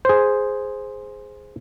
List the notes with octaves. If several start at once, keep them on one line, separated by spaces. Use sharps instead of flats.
G#4 C5